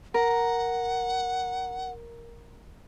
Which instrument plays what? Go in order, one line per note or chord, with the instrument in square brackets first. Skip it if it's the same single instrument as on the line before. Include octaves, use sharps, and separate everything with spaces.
[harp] A#4 [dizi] F#5